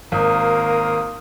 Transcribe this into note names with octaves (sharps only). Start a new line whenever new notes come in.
G#1 A#3 F4 A#5 D#6